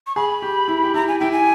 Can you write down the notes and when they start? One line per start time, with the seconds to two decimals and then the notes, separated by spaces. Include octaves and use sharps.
0.07 C#6
0.16 G#4 B5
0.42 G4
0.68 E4
0.84 G4
0.94 E4 A#5
1.08 G#5
1.20 E4 G5
1.32 G#5